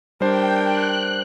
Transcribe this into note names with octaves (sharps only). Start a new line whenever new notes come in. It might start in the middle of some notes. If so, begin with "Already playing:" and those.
G3 D4 A#4 C5 G5
F#6